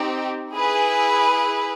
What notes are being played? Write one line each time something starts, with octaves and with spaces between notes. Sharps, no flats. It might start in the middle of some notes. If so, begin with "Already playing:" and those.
Already playing: C4 D#4 G4
E4 G#4 B4